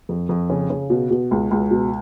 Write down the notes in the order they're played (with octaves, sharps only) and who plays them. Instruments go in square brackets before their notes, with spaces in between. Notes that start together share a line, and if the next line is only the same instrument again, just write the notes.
[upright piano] F2
F2
C#3
C#3
B2
B2
C#2
C#2
B2